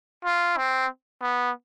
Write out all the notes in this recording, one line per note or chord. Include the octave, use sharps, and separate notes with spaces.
F4
C4
B3